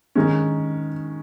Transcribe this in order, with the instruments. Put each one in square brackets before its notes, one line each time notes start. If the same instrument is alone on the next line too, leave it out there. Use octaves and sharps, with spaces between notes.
[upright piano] D#3 G#3 C#4